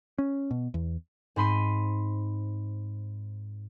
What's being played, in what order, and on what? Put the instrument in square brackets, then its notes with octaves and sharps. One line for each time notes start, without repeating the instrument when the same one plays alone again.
[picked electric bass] C#4
B2
E2
[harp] G#2 C4 B5 C6 D#7